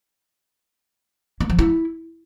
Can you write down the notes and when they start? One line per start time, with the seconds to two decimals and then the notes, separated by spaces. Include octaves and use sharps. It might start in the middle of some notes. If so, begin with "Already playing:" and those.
1.41 A#3
1.50 F3
1.59 E4